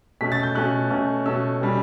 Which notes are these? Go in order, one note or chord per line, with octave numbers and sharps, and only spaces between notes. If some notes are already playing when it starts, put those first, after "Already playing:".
B2 A3 C#4 B6
A6
G6
B2 A3 C#4 F#6
B2 A3 C#4
B2 A3 C#4 E6
B2 G3 C#4